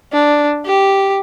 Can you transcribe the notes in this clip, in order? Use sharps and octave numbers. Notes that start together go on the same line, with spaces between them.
D4
G4